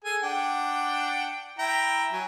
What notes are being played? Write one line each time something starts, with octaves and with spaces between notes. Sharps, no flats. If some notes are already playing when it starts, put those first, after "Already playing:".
G#4 A4 G#5
D4 F#5 G5
E4 G5 A#5
F#3 G#5